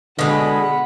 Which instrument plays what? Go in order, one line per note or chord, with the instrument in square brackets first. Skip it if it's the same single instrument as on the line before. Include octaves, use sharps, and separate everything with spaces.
[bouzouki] B2 G#3 [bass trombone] D3 [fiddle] F#5 B5